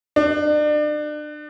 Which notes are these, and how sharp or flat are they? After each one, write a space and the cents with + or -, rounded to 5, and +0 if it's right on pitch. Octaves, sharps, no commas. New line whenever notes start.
D4 +35